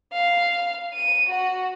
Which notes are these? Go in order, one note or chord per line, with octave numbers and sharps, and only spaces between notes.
F5
D#7
F#4